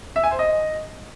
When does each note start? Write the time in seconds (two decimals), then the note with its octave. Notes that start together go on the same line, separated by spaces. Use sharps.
0.16 E5
0.24 G#5
0.31 C5
0.39 D#5